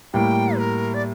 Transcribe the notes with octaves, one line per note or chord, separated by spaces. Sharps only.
A2 G3 A#3 G5
A#4
D5